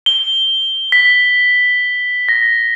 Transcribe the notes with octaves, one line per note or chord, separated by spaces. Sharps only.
G7
B6
A#6